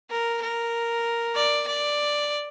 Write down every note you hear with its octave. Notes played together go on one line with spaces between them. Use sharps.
A#4
A#4
D5
D5